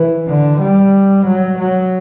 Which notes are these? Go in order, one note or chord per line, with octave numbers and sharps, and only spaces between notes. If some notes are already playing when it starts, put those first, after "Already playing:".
Already playing: E3
D3
G3
F#3
F#3